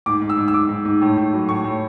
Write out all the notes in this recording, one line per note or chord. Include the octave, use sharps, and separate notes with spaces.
G#2 D6
G#2
E6
G#2
E6
G#2 D6
G#2
G#2
A2
A2
F#3
A2 C#6
A2